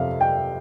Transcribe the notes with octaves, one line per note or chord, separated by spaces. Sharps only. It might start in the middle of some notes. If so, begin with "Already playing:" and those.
Already playing: F2 C3 E5 F5
G5